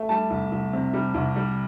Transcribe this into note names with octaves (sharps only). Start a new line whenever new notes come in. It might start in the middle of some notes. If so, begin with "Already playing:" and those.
Already playing: A3
G3 A5
C2
C2
C3
G3
C2
G3